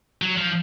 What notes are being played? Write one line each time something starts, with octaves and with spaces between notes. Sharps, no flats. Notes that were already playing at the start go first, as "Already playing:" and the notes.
F#3
F3